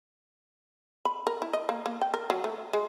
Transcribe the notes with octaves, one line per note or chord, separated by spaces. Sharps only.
B5
A#4
E4
D#5
A#3
A#3
G5
A#4
F#3
A3
G#3